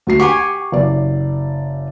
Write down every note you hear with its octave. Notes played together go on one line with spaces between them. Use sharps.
D2 F#4 C7
G4 F#5 G#5 C#6
F#1 D5